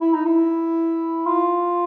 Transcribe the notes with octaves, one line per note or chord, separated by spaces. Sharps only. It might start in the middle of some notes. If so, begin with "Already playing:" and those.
E4
D#4
E4
F4